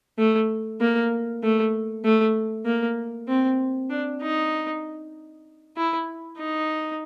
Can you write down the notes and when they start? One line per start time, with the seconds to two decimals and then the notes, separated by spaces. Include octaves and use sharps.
0.18 A3
0.81 A#3
1.43 A3
2.05 A3
2.66 A#3
3.28 C4
3.90 D4
4.22 D#4
5.77 E4
6.38 D#4